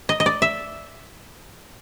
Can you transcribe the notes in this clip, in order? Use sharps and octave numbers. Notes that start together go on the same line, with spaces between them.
D#5
D#5
D5
E5